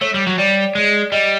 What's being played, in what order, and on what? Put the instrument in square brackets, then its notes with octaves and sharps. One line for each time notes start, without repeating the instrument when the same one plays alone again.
[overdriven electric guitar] A3 [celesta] C#5
[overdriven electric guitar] G3
F#3
[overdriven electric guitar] G3 [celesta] D5
[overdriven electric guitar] G#3
[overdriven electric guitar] G3 [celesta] D#5